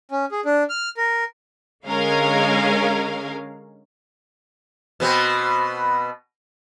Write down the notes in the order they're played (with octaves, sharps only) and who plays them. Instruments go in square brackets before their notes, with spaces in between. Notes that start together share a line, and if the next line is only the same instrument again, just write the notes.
[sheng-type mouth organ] C#4
G#4
D4
F6
A#4
[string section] D3 G#3 C#4 A#4 F5
[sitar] B2 B3 C4